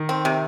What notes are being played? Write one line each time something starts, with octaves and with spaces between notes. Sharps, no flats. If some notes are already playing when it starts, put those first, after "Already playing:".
Already playing: D#3
C4
C3